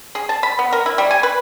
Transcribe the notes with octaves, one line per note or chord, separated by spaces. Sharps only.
G#4
A5
B5
B3
A#4
E4
G3
G#5
B4